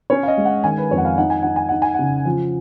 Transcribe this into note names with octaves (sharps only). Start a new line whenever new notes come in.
C#4 C#5
F5
D#5
G#3
F#5
D#3 G#5
B4
F2 C#5
F#5
F5
D#4 F#5
G#5
D#4 F#5
G#5
D#4 F#5
G#5
C#3 F#5
F3